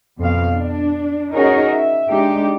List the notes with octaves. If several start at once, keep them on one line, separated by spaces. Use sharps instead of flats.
F2 B2 F5
D4
C#4 D#4 F#4 G#4 A#4 C#5
E5
G#3 D4 D#4 G4